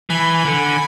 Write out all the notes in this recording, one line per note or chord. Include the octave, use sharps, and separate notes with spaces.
E3 G#5 B5
D3